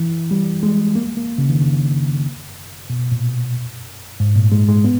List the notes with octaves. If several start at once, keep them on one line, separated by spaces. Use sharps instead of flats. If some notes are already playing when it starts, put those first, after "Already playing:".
Already playing: E3
G3
G#3
A#3
A#3
C#3
D#3
C#3
B2
A#2
G#2
A#2
G#3
G#3
B3